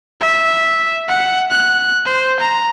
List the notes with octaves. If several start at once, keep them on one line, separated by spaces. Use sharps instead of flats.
E5
F#5
F#6
C5
A#5